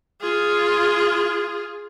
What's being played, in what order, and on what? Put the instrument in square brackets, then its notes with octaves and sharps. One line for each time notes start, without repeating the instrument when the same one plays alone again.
[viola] F4 G#4